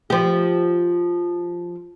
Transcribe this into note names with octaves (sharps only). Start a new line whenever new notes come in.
F3 G4